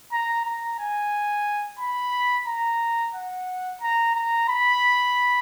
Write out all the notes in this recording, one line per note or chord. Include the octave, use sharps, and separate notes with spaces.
A#5
A#5
G#5
B5
A#5
F#5
A#5
A#5
B5